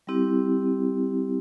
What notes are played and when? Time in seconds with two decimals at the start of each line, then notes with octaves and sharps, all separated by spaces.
0.07 G3 C4 E4 G4